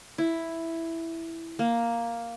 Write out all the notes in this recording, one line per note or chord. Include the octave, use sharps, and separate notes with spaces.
E4
A#3